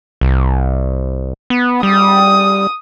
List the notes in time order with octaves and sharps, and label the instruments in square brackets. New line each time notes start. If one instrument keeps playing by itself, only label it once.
[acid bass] C2
B3
[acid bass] G3 [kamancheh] D#6